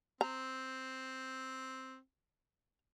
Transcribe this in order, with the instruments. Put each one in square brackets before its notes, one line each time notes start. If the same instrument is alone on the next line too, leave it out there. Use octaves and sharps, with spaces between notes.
[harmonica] C4 [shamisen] A#5